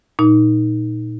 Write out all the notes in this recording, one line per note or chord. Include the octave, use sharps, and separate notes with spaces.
A#2 D#4